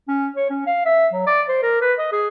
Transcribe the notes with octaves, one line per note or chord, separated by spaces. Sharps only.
C#4
C#5
C#4
F5
E5
F#3
D5
C5
A#4
B4
D#5
G#4